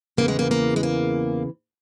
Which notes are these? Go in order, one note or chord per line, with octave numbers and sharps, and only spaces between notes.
E2 C#3 E3 A#3
G#3
A#3
A#3
G#3
A#3